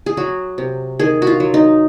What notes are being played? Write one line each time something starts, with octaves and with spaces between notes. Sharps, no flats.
G#4
F#3 F#4
C3
D#3 G#4
F#4
F4
F#3
D#4